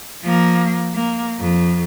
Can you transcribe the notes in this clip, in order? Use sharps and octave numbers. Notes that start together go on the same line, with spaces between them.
F3 A#3
A#3
F2